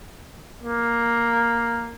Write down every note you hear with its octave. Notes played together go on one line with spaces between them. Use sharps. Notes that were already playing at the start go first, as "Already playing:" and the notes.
A#3